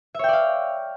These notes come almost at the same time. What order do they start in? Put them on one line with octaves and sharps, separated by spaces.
E5 C#5 G5 D5 F5